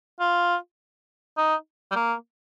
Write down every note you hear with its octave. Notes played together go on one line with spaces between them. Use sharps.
F4
D#4
G3
A#3